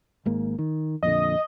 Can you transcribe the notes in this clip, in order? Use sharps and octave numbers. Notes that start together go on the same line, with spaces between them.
G#1 G#2 A#3
D#3
F2 A#2 D3 D#5